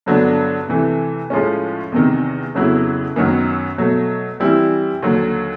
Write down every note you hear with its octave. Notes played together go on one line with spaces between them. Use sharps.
G2 D3 F#3 B3 D4
C3 E3 A3
A2 F3 G#3 C#4
E2 C3 D#3
F2 C#3 F#3 B3 E4
F#2 D#3 F#3 B3
B2 F#3 A3
E3 G3 C4 E4
D#2 D3 F#3